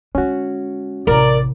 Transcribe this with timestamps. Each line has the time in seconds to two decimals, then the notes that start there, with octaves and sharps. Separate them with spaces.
0.15 D3 G#3 C#4 F#4
1.07 A1 C3 A#4 D5